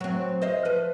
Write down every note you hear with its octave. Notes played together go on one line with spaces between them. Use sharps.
F#3 C4
C5 D#5 F5
F3 B4